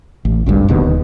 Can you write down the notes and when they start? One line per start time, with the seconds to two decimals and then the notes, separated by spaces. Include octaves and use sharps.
0.25 A1
0.46 G#1 D2 G2
0.68 D1 D#2 B2 D3